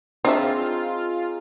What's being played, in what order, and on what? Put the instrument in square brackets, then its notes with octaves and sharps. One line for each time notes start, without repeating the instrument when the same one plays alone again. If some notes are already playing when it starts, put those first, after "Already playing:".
[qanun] C4 [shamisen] D4 E5 [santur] D#4 G#4 [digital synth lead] F4